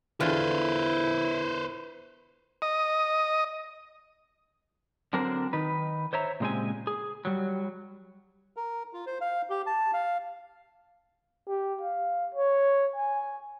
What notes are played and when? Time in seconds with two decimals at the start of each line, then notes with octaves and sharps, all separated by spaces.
0.20 E2 D3 E4 F4 B4 C5
2.62 D#5
5.13 D3 F#3 C4 D4 A#4 C5
5.53 D#3 D#4 B4
6.13 C5 C#5 E5 A#5
6.40 A#2 C#3 G#3 C4 G4 G#5
6.87 G#4
7.25 F#3 G3
8.57 A#4
8.93 F4
9.07 C5
9.21 F5
9.50 G4
9.66 A5
9.93 F5
11.48 G4
11.81 F5
12.34 C#5
12.96 G#5